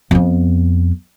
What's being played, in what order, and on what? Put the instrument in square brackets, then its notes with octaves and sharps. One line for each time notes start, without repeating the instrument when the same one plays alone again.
[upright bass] F2 B3